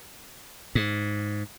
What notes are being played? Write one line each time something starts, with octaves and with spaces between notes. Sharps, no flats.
G#2